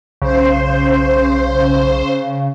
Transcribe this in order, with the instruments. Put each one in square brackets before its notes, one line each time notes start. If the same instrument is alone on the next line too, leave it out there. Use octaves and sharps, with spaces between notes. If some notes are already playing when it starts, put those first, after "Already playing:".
[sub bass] B1 [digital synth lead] C#3 [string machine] C5